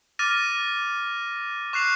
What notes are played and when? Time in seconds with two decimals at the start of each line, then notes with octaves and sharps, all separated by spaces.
0.19 D6 F6 A6 A#6 D#7
1.73 C#6 F#6 C7 F7